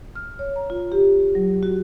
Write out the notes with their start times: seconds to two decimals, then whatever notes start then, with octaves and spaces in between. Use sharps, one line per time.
0.16 F6
0.39 C#5
0.56 A#5
0.70 F4
0.92 G4
1.35 F#3
1.63 F#4